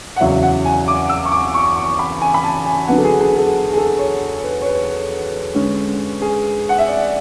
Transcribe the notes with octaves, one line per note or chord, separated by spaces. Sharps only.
F#5
E2 C#3 F#3 C#4 E5
F#5
G#5
D6
E6
C#6
D6
C#6
C#6
B5
G#5
B5
A5
G#5
D3 F#3 B3 F#5
A4
G#4
G#4
A4
G#4
A4
C#5
B4
C#5
B4
D3 G#3 C#4
G#4
F#5
E5
D5